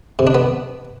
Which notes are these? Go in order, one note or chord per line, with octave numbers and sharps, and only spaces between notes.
C3
D4
B3